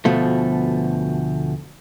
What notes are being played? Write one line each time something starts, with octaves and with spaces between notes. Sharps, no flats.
D2 B2 F3 A3